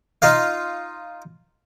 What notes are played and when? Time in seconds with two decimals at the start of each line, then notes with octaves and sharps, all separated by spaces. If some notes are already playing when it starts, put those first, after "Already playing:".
0.22 D#4 F4 F5